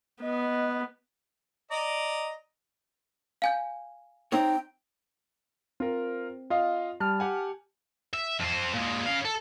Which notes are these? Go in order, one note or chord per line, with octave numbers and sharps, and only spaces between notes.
B3 D#5
D5 D#5 A#5
F5 G#5 G6
C4 D#4 C#5 G5
C4 F4 A#4
F4 D#5 F5
G3 A5 F6
G4 F#5 G#5
E5
F2 C5
A#2 G#3
C#3 F5
A4